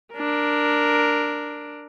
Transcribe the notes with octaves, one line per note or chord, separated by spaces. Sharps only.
D4 A#4